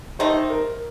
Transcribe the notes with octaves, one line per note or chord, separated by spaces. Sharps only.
D#3 A3 D#4 C5
A#4